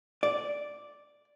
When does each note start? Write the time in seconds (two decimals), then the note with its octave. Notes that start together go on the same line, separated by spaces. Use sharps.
0.23 D5